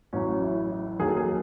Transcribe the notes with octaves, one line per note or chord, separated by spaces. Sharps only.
A1 A2 F#3 C#4
E4
E4
D#2 D#3 F#3 G#4
A4
G#4